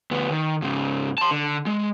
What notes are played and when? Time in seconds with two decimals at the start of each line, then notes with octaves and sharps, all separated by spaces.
0.11 D2 B3
0.31 D#3
0.62 G#2 C#3
1.18 A5 C6
1.31 D3
1.66 G#3